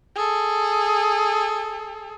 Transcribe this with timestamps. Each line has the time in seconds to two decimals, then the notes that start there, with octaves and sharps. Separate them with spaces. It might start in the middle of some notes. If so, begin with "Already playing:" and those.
0.16 G#4 A4